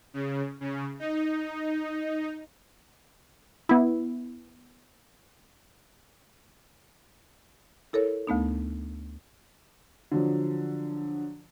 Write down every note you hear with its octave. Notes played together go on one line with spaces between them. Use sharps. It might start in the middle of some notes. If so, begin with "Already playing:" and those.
C#3
C#3
D#4
B3 E4
E4 A4 A#4 C#5
D2 A3 B3 D#4
D3 F3 F#3